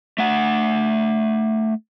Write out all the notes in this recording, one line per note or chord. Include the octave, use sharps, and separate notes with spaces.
A3 F#5